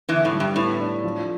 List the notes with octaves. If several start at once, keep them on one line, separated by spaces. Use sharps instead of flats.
E2 D3 E3
A2
G3
G2
A2 B3
D4
F3